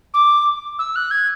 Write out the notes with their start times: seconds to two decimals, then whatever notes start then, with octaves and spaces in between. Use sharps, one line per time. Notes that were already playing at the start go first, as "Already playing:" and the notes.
0.14 D6
0.79 E6
0.96 F#6
1.11 G#6